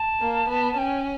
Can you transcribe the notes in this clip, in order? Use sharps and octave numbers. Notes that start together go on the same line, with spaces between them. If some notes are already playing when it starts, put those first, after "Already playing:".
Already playing: A5
A#3
B3
C#4 G5